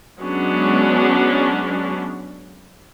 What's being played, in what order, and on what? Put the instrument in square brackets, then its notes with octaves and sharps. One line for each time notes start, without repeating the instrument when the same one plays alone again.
[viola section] F#3 G#3 B3 C#4 D4